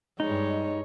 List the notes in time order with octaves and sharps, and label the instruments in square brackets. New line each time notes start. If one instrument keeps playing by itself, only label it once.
[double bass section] G2 G3 [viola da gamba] G#3 C#5 [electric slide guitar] D#4